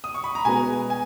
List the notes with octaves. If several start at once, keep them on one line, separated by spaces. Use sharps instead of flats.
D#6
C#6
B5
A#5
B2 G#3 B3 G#5
G#5